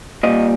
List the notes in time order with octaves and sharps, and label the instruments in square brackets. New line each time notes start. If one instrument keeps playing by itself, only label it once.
[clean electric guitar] A#2 G3 D#5